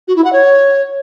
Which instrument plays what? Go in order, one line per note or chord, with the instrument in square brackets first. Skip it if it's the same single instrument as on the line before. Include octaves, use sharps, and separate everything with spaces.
[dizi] F#4
E4
F#5
C#5